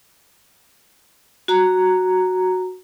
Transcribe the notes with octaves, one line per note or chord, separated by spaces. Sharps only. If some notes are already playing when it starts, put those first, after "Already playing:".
F#4 A#5